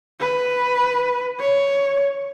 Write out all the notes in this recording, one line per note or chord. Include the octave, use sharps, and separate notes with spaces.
B4
C#5